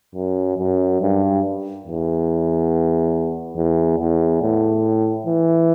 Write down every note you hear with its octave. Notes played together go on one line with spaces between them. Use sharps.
F#2
F#2
G2
E2
E2
E2
A2
E3